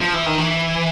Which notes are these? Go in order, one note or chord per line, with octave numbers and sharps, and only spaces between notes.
F3
E3
D#3
E3